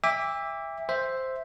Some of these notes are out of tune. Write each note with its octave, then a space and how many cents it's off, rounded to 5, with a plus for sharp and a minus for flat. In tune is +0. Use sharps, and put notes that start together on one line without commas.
E5 +0 G5 +45 D6 -10
C5 +0 E5 +0